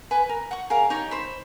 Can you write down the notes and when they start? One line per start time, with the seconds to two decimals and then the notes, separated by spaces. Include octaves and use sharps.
0.11 B4 G#5 B5
0.29 A#4
0.51 F#5 C#6
0.70 G#4 A#4 F5
0.90 D#4 G4 C#5
1.11 C5 B5